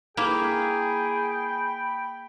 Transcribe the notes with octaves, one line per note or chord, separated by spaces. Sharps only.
A#3 E4 G#4 G5 B5